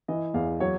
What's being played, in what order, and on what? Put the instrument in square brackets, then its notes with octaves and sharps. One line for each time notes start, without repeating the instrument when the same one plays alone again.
[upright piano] E3 D#5
E2 F5
F#3 C#5